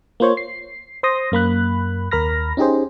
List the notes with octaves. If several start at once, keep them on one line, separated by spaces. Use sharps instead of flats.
A#3 F4 C5 C#5
C7
C5 C6 D#6 A#6
F#2 A#3 B5 F#6
D#2 A#4 B5 F6 A#6
C#4 D#4 G4 G#4 C5